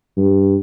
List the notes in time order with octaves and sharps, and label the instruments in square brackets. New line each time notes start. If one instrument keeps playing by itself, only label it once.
[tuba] G2